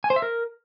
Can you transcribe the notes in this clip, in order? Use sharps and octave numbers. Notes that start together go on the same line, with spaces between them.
G#5
C5
E5
A#4